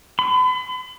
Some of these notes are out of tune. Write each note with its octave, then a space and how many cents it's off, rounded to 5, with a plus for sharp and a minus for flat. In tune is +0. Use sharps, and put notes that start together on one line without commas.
B5 +40